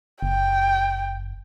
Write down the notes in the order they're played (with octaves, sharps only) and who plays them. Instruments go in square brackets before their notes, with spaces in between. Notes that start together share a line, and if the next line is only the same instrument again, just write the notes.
[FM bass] F#1 [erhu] G5